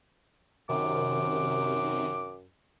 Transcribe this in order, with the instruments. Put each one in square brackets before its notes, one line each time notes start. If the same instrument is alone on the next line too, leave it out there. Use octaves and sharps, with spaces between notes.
[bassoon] F#2 [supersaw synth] C3 D#3 [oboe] D6